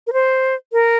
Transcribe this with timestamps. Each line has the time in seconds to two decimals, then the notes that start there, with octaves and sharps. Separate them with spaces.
0.07 A#4
0.13 C5
0.73 A#4